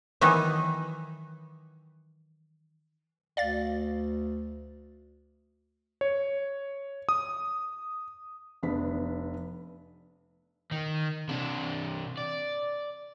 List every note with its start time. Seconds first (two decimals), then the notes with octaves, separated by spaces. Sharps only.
0.21 D#3 E3 F#3 B3 D#4
3.37 D2 D5 F5 A6
6.01 C#5
7.09 D#6
8.63 F1 B3 D4 B4 B6
10.72 D#3
11.29 C3 D4
12.17 D5